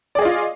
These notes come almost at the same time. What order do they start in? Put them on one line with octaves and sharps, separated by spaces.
D5 G#4 D#5 F4